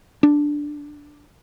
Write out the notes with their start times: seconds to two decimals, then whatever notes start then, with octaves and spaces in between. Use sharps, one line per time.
0.23 D4